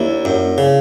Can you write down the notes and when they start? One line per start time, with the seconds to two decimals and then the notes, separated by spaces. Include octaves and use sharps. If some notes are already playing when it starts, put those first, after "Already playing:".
Already playing: D#2 D4 E4
0.25 F#2
0.58 C#3